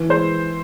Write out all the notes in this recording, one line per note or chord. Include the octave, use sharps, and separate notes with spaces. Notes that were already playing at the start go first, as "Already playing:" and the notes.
Already playing: E3
G#3 C5